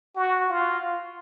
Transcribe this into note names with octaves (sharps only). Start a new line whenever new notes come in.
F#4
F4